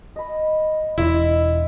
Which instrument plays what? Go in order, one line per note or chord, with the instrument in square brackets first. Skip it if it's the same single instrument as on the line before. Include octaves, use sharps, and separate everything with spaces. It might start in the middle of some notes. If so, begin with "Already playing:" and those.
[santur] D#5 B5
[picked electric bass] E1 [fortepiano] E4 [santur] D#5 E5 C6